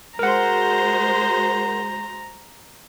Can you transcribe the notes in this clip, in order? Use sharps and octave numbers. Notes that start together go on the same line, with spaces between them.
G#3 F#4 A#4 C5 F#5 A#5